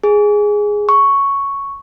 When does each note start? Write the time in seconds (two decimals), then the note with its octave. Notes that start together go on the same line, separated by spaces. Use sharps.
0.04 G#4
0.89 C#6